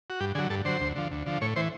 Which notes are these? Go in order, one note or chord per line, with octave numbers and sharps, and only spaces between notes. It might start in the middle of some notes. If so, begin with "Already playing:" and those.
F#4
G2 G4
D3 F#3 G#4
G2 A4
D3 F#3 C5
D2
D3 F3
D2
D3 F3
A2 C#5
E3 C5